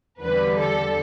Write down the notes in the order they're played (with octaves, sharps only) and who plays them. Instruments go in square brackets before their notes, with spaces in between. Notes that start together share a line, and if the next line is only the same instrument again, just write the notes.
[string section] E2 D3 G3 B4
A4